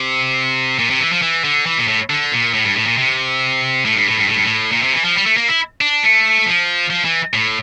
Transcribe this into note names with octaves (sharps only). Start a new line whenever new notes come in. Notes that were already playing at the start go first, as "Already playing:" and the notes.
Already playing: C3
A#2
C3
E3
F3
E3
D3
E3
A#2
A2
D3
A#2
A2
G2
A2
A#2
C3
A2
G2
A2
G2
A2
G2
A2
A#2
C3
E3
F3
G3
A3
A#3
E4
D4
A3
F3
F3
E3
A2